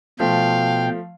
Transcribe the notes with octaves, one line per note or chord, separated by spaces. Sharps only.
B2 F3 A3 F5 G5